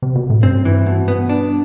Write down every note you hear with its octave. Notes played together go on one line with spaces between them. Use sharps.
C3
B2
A2
G2 C4
E3
B2
B3
D4